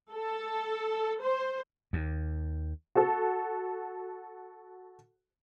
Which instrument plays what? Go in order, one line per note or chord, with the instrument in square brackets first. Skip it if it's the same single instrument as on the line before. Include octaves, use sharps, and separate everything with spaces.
[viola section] A4
C5
[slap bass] D#2
[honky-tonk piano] F#4 A4